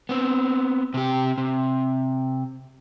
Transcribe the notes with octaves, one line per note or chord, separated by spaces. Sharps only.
B3 C4
C3 G4
C3